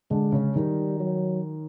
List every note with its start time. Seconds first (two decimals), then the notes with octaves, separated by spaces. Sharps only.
0.10 D3 G#3 D4
0.32 C#3 C#4
0.56 D#3 G3 D#4
1.00 F#3